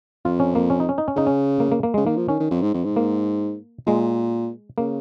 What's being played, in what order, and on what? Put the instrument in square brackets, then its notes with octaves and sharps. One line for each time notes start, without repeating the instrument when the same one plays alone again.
[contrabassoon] F2 [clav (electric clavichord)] F4
[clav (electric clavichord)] C#4
A#3
C#4
D#4
C#4
D#4
C#4
[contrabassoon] C#3 [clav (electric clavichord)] D#4
[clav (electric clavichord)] C#4
A#3
A#3
A#3
[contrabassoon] C#3 [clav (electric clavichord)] G#3
[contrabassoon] D#3 [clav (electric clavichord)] A#3
[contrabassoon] F3
[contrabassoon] D#3 [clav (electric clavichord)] C#4
[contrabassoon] D#3
F2
G#2
F2
G#2
[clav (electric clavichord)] A#3
[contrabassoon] A#2 [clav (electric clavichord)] G#3
[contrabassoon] C#3 [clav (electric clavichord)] A#3